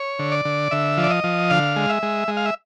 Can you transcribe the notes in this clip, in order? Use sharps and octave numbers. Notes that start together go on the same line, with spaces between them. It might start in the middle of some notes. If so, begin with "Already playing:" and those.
Already playing: C#5
D3
D5
D3
D3 E5
F3
D5
D#5
F3
D3 F5
G#3
E5
G#3
G#3
F5
E5